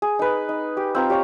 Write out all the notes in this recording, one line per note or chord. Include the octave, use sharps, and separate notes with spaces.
G#4
D#4 B4
D#4
G4
C4 F4 A#5
G4 C#5 F5 A#5